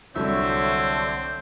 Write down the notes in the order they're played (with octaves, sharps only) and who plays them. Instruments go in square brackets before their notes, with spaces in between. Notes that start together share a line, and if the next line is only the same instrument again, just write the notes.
[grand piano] C2 F#3 [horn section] D3 C#5 [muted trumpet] C4 [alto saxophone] E5